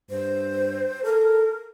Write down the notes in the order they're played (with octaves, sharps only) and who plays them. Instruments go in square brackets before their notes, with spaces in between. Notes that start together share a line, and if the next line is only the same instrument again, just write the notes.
[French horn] G2 [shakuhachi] C5
[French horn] A4 [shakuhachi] A#4